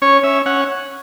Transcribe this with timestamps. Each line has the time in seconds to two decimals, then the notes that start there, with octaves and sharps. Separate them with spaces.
0.02 C#4 C#5
0.23 C#4 E5
0.46 C#4 F#5